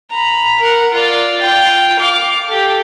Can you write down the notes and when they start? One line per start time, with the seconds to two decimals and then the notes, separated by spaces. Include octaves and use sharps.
0.11 A#5 B5
0.60 A#4 F#5
0.93 F4 D5
1.41 F4 G5
1.99 F5 D6
2.48 G4 A4